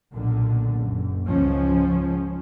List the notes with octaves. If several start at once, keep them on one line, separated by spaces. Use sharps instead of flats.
B1 A#2 D3
F#1
C#2 G#2 F3 C#4